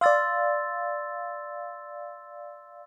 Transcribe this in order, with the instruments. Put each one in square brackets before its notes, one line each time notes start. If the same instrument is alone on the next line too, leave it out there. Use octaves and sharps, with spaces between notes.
[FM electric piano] D5 F5 [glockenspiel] C6 E6 A6